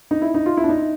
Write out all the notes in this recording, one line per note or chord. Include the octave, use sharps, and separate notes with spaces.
D#4
E4
D#4
F4
E4
D4
D#4